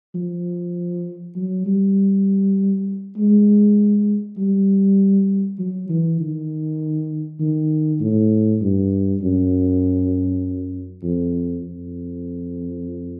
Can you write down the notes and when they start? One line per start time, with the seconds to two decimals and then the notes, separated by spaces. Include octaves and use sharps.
0.15 F3
1.36 F#3
1.66 G3
3.18 G#3
4.38 G3
5.59 F#3
5.90 E3
6.20 D#3
7.40 D#3
8.01 A2
8.61 G2
9.22 F#2
11.03 F2
11.63 F2